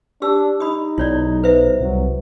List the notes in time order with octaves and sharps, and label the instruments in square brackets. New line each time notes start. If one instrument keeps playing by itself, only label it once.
[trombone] D4 [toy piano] G4 E6
[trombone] D#4 [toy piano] B5 D#6
[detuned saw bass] B1 [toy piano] E4 C#5 D5
[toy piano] B4 C5 E5
[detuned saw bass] C2 [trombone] F#3